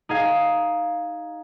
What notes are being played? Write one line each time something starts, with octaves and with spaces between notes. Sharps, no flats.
D#4 G#4 F5